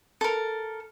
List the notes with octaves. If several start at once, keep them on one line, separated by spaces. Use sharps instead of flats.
A4 A#4